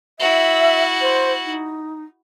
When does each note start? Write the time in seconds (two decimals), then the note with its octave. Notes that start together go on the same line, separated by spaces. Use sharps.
0.20 E4 F#4 E5
1.02 C5
1.45 D#4